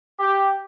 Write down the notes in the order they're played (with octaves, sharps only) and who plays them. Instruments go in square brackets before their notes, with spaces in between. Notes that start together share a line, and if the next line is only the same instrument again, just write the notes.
[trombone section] G4